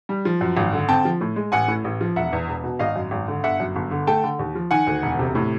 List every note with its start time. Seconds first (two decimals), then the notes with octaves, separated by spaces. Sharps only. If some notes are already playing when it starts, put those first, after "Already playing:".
0.09 G3
0.25 F3
0.41 F#2
0.57 G#1
0.73 D3
0.89 C4 G5 A5
1.05 F3
1.21 A2
1.36 G#3
1.52 A1 F#5 G#5
1.68 A2
1.84 A1
2.01 F3
2.16 E1 E5 F#5
2.33 E2
2.48 E1
2.64 B2
2.79 G#1 D#5 F5
2.96 F#2
3.11 G#1
3.28 D3
3.44 G1 E5 F#5
3.60 F#2
3.76 G1
3.91 D3
4.07 A3 G5 A5
4.24 D3
4.39 D#2
4.55 F3
4.71 D#3 F#5 G#5
4.87 D2
5.02 E1
5.19 C3
5.35 A2